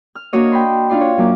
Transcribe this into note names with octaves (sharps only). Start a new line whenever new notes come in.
F6
A#3 D4 F#4 C#5 D#5
G5 B5 C6
D4 D#4 F4 D5 C6
C#5
F#2 A#3 D6